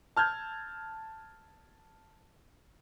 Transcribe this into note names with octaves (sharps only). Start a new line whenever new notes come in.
A5 F6 G6 G#6